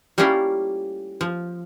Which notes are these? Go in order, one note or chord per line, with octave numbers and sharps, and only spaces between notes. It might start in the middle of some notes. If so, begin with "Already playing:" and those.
G3 A3 A#3 C#4 E4 F4
F3